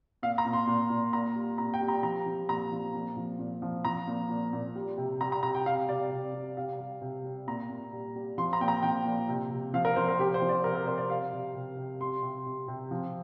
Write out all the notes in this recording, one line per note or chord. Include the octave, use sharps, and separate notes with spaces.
A#2 F5
A#5
A#2
C6
A#2
A#2
A#2 A#5
G3
A#2 A#5
G5
G3
A#5
F3 A#5
F3
A#2 A#5
F3
A#2
F3
A#2
F3
F3 A#5
A#2
A#2
A#2
G3
C3
G3 A#5
A#5
C3 A#5
G5
G3 F5
C3 D5
C3
G3
C3 F5
G3
C3
G3
A#2 A#5
A#2
G3
G3
F3 C6
A#5
A#2 G5
A#5
F3 G5
A#2
C3
C3
F3 F5
A#4
F3 C5
A#4
C3 G4
C5
F3
D5
C3 A#4
A#4
C3 C5
D5
G3 F5
C3
C3
C3
G3 C6
C3
C3
C3
F3